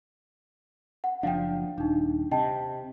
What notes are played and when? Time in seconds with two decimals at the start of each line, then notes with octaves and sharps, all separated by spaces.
1.04 F#5
1.23 F#1 F3 D4 F5 G5
1.78 D#1 D4 D#4
2.31 C3 D#5 G5 A5